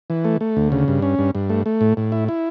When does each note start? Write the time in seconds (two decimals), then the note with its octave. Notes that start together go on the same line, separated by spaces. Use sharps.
0.10 E3
0.25 A3
0.41 A3
0.57 D2
0.72 C#3
0.88 G2
1.02 C#4
1.19 G2
1.35 G2
1.50 A3
1.66 A3
1.81 A2
1.97 A2
2.12 E4
2.29 E4